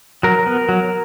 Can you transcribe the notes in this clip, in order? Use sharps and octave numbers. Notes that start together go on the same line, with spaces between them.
F#3 A#4
B3
F#3